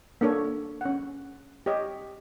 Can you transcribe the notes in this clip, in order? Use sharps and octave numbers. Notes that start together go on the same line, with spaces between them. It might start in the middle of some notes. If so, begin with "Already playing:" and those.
A#3 D4 A4 C#5
C#4 F#5
G4 C#5 D#5